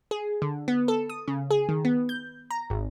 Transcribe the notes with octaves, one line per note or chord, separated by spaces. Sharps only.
G#4
D3
B3
A4
D#6
C#3
G#4
D#3
B3
G6
A#5
G#1